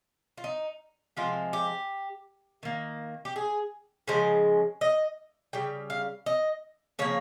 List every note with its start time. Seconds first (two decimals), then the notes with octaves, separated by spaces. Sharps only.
0.38 F4
0.44 D#4
1.17 C3 F3 G#3 F4
1.53 G4
2.63 D#3 A#3
3.25 G4
3.36 G#4
4.08 C#3 F3 G#3 C5
4.81 D#5
5.53 C#3 G3 G5
5.90 F5
6.26 D#5
6.99 C#3 F3 A#3 C#5